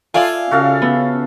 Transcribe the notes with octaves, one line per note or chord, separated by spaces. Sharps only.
F4 A4 D5 E5 G#5
C#3 C#4 F#4 A4 F5
B3